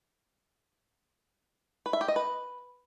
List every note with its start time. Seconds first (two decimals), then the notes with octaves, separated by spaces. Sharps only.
1.86 B4
1.93 E5
2.01 G4
2.08 D#5
2.16 B4